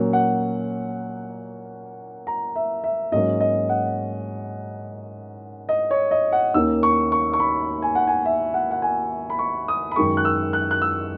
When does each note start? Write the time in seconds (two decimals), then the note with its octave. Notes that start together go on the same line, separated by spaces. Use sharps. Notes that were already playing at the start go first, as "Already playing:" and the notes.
Already playing: A#2 F#3 A#3 C#4
0.13 F#5
2.27 A#5
2.56 E5
2.84 E5
3.12 G#2 F#3 A#3 C#4 D#5
3.40 D#5
3.69 F#5
5.69 D#5
5.91 C#5
6.11 D#5
6.32 F#5
6.54 D#2 D#3 A#3 C#4 E6
6.83 C#6
7.12 C#6
7.33 C#6
7.40 B5
7.82 G#5
7.95 F#5
8.07 G#5
8.26 E5
8.54 F#5
8.71 F#5
8.82 G#5
9.30 B5
9.39 C#6
9.68 D#6
9.91 B5
9.96 F#2 D#3 G#3 C#6
10.17 F#6
10.25 E6
10.53 F#6
10.71 F#6
10.82 E6